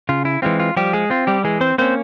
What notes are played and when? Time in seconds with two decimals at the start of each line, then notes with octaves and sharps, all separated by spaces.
0.09 C#3 F4
0.25 E4
0.42 E3 G#3 C4 F4
0.60 F4
0.77 F3 G3 G4
0.93 G#3 G#4
1.10 C4 F4
1.27 G3 G4
1.44 E3 G#3 G#4
1.61 C4 C5
1.78 A#3 C4 C#4 C5